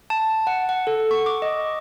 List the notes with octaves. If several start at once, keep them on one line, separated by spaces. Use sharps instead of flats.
A5
F#5
F#5
A4
C#6
D6
D#5